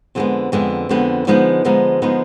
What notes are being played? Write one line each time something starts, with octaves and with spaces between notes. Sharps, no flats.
F2 D3 G#3 B3
F2 D3 G#3 B3
F2 D3 G#3 B3
D3 F3 G#3 B3 D#4
D3 F3 G#3 B3 D#4
D3 F3 G#3 B3 D#4